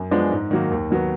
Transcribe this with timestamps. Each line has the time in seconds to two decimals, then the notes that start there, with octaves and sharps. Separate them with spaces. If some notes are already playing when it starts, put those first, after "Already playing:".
Already playing: F#2
0.11 F3 G#3 B3 D4
0.31 G#2
0.51 D#3 F#3 A#3
0.71 D#2
0.91 D#3 F#3 B3